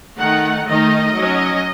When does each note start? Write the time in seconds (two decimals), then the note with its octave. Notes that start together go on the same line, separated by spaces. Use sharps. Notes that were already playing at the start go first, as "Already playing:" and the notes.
0.18 D#3 A3 D#4 F#5
0.67 D#3 A3 D#4 D#5
1.16 F#3 C#4